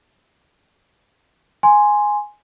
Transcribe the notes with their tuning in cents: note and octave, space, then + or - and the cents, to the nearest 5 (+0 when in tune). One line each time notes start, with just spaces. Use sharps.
G#5 +0 C6 +0